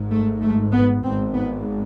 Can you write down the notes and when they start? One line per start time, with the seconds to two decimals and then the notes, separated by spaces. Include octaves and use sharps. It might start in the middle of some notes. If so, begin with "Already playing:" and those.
Already playing: G#1 G#2
0.11 A3
0.42 A3
0.72 B3
1.04 G#1 G#2 C4
1.34 B3